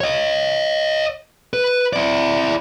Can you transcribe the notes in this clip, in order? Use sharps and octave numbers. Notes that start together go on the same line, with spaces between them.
C#5 D#5
B4
E4 D5